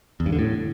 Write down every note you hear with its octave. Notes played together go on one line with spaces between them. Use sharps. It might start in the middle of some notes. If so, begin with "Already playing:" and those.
E2
G2
D3
A2